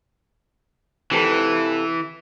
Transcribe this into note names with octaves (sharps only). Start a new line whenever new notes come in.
C3 E3 G4 A4